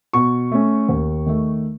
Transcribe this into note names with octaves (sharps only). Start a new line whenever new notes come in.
B2 C#6
A3 C#4
D#2
D#3 A3